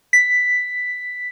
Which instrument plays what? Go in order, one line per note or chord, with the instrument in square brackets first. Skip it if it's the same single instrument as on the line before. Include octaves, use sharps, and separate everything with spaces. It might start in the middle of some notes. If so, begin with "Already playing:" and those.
[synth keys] B6